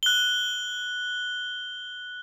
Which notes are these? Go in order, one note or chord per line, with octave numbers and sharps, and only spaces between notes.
F#6 G7